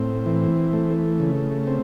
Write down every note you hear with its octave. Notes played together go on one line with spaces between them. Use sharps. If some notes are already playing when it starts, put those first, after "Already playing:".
Already playing: A2 C4
E3
A3
C#3
C4